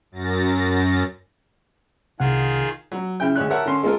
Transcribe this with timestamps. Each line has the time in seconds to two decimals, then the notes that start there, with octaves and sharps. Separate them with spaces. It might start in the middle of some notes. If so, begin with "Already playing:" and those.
0.12 F#2 A6 A#6
2.20 C2 C3 D#3 F4 G#4 F#5
2.92 F#3
3.20 C#3 E4 G5
3.35 D2 G#3 C#5 F#6
3.50 G4 A#4 C#5 E5 F#5 A5
3.65 D3 C#4 C6
3.83 G#3 A#3 F4 A4 A#4